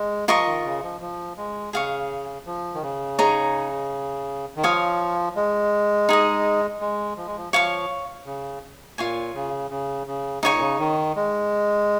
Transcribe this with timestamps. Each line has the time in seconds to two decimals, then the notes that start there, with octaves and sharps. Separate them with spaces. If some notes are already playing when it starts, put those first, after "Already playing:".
Already playing: G#3
0.28 F3 F4 A#4 D#5 C#6
0.46 D#3
0.65 C#3
0.83 F3
1.01 F3
1.37 G#3
1.73 C#3 G#4 F5 C#6
2.46 F3
2.75 D#3
2.82 C#3
3.19 D#4 G#4 C#5 A#5
4.56 D#3
4.63 F3 C#5 F5 G#5 D#6
5.36 G#3
6.09 D#4 G#4 D#5
6.81 G#3
7.17 F3
7.27 G#3
7.37 F3
7.53 F3 C#5 F5 C#6
8.26 C#3
8.98 A#2 F4 C#5 G#5
9.34 C#3
9.71 C#3
10.07 C#3
10.43 C#3 D#4 C#5 G#5 C#6
10.52 A#2
10.61 C#3
10.80 D#3
11.16 G#3